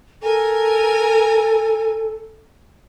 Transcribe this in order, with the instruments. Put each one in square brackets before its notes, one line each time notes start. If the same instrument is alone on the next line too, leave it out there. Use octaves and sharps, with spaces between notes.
[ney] A4 [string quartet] A#4 G#5